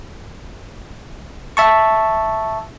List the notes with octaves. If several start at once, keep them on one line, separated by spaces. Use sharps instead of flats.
E5 A5 C#6